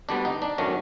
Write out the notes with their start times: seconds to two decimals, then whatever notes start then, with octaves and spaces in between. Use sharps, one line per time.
0.09 D2 D3 G3 B3 D4
0.25 D#4
0.42 D4
0.58 D#3 F#3 A3 C#4